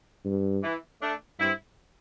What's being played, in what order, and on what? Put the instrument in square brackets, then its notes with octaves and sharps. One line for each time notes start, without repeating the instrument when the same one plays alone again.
[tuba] G2
[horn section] E3
A3 D4
[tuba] G2 [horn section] C4 E4